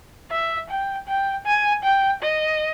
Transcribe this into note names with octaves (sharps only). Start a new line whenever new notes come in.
E5
G5
G5
G#5
G5
D#5